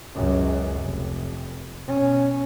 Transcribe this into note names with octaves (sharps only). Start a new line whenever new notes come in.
C#2 F#2
F1
B2 C#4